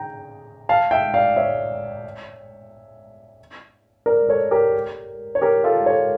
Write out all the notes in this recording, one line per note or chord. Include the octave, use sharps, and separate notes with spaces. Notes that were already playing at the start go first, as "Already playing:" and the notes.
Already playing: G5 A#5
F5 A5
E5 G5
D5 F5
C#5 E5
A#4 D5
A4 C#5
G4 A#4
C#5
G4 A#4
F4 A4
A4 C#5